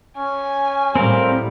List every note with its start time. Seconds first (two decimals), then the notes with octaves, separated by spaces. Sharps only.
0.17 C#4 G#5
0.95 A2 G3 C4 A#4 F5